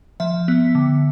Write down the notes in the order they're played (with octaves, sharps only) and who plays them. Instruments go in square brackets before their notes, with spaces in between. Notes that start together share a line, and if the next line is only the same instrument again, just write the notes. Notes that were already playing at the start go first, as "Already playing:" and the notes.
[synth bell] F3 E5
B3
D3